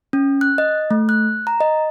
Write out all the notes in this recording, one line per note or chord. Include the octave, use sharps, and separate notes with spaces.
C#4
F#6
D#5
A3
F#6
A#5
D#5